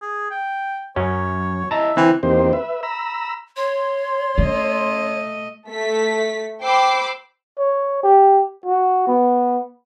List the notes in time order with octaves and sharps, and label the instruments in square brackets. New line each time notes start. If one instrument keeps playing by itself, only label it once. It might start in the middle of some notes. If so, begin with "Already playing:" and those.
[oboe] G#4
G5
[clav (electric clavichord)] F#2 C#4 [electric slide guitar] F#3 [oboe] C#5
[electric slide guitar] E4 C#5 D#5 [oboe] E5 [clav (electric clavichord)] A5 A#5
[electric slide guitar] D3 [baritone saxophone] E3 [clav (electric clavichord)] C4
[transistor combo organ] E2 A#3 C4 D#4 G4 C5
B4 E5
A#5 B5 E6
[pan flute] C#5 [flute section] C6
[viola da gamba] A3 D#5 [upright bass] C#4
[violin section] A3 B6
C5 G5 B5 D6 E6 C7
[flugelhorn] C#5
G4
F#4
B3